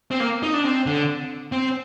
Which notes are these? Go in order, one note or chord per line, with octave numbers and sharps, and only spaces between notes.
C4
A#3
D#4
D4
C4
D3
C4